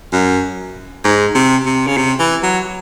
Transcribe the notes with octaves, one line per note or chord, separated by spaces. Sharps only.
F#2
G#2
C3
C3
C#3
C3
E3
F#3